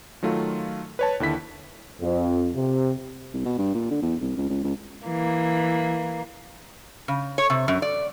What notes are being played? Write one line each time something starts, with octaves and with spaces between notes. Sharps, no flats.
D#3 F#3 A3 F4
B4 C#5 A5
D#2 D3 E4 B6
F2
C3
C2
B2
G2
A#2
D3
E2
C2
C#2
C#2
C#2
E3 A#3
C#3
C#5
C3
F#2
D5